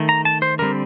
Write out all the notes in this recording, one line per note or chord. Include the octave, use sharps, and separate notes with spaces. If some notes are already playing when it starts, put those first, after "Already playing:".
Already playing: D#3 A3
A#5
A5
C5
D3 G3 C4 A#4